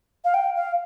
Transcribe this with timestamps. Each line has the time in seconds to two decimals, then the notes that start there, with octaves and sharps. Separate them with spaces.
0.25 F5
0.34 G5
0.56 F5